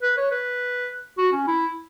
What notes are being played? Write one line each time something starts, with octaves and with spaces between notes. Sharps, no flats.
B4
C#5
B4
F#4
C#4
E4